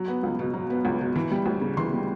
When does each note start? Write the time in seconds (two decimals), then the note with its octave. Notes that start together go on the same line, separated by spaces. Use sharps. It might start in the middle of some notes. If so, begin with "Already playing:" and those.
Already playing: F#3
0.08 B3
0.23 C#2
0.39 B2
0.54 F#3
0.70 B3
0.85 C#2
1.01 B2
1.16 E3
1.32 G3
1.46 D2
1.61 C#3
1.77 E3 C6
1.93 G3